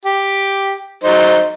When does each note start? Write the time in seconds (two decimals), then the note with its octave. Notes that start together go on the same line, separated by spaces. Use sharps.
0.05 G4
1.04 F#3 D#4 C5